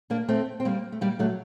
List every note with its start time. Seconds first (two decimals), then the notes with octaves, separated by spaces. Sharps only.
0.10 A#3 D4
0.28 A3 C4
0.60 C4
0.65 G3 A#3
0.92 A3
1.01 G3 A#3
1.19 F#3 A3